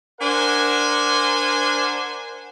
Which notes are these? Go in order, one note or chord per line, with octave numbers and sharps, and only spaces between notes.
D4 A#4 C5 F#5 G#5